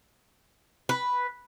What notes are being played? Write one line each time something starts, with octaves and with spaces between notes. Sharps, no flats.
B4